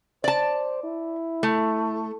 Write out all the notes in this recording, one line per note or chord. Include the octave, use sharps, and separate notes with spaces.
C5 D5 A5
E4
A3